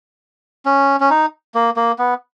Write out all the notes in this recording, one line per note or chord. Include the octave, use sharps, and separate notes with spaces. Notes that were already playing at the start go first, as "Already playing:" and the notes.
C#4
C#4
D#4
A#3
A#3
B3